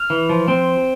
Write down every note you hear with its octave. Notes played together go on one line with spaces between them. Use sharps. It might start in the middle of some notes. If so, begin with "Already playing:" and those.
Already playing: F6
E3
F3
C4